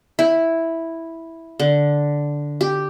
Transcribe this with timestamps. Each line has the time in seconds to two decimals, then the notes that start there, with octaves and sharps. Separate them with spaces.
0.19 E4
1.60 D3
2.61 G4